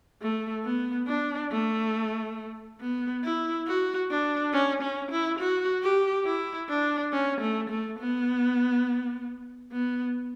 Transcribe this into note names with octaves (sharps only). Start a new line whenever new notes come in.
A3
B3
D4
A3
B3
E4
F#4
D4
C#4
C#4
E4
F#4
G4
E4
D4
C#4
A3
A3
B3
B3